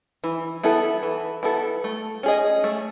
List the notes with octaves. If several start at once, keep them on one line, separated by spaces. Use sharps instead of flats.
E3
B3 E4 A4
E3
B3 E4 A4
A3
C#4 G#4 D#5
A3